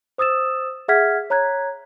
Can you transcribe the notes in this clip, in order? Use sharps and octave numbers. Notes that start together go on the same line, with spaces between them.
C5 D#6 E6 A6 E7
G#4 E5 F#5 F6 G#6 B6
C#5 A#5 F#6 G#6